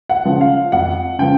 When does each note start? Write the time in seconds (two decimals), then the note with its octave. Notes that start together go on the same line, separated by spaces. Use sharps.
0.09 F#5
0.25 C#3 F3
0.41 F5
0.72 F2 F#5
1.19 C#3 F3 G5